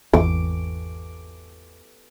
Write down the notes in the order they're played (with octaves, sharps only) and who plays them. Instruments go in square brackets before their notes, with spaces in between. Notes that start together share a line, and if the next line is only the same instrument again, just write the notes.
[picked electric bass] G#1 E2 [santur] D6